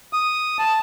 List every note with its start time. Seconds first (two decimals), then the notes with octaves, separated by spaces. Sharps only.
0.13 D#6
0.59 A5